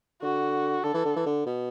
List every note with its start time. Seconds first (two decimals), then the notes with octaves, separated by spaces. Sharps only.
0.22 D3 F#4
0.84 D3 A4
0.94 E3
1.05 D3
1.16 E3
1.26 D3
1.46 B2